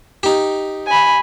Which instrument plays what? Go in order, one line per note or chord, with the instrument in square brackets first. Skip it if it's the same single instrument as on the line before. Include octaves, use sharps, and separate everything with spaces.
[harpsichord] D#4 G4
[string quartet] G#5 B5